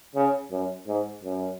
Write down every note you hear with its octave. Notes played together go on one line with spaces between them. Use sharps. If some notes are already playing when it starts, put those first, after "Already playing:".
C#3
F#2
G#2
F#2